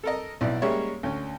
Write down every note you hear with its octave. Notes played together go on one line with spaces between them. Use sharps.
A4 A#4 D#5
B1 E4 D5
G3 G#3 A#3 C#4 C#5 E5
D2 C#4